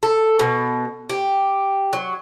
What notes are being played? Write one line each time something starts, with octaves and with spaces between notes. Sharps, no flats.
A4
B2
G4
F#3